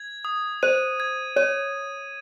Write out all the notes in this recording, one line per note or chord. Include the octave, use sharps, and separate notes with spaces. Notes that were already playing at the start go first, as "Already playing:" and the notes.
Already playing: G#6
D#6
C5 D#7
G#6
C#5 D#7